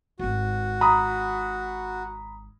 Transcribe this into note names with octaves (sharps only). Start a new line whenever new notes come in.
D#1 G#1 F#4
A#5 B5 D#6